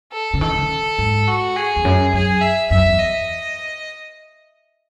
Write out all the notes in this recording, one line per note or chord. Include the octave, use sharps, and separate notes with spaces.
A4
C#3
D#3 A4
C#3
G#2
F#4
G#4
E2
F#2
F#2 G#4
E5
F#2 E5
E2
D#5